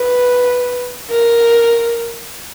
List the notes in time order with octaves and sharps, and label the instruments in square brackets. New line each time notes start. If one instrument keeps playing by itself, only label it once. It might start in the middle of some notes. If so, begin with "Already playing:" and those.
Already playing: [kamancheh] B4
A#4